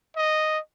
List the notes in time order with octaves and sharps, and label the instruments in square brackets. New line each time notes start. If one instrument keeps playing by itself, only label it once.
[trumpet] D#5